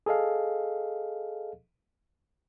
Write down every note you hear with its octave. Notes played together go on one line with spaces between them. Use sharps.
G#4 A4 D#5 F5